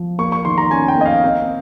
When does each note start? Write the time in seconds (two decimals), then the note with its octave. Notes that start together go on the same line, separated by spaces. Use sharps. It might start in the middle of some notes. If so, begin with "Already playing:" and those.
Already playing: F3
0.18 A#3 C#6
0.32 C#6
0.45 D#3 C6
0.58 A#5
0.71 C#4 G#5
0.88 G5
0.97 A#3 D#5
1.06 F5
1.24 C4